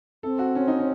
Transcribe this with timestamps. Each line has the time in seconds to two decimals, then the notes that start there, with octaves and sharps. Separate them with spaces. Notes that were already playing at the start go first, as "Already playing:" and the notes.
0.23 C4 A4
0.39 F#4
0.55 C#4
0.67 D#4
0.79 C#4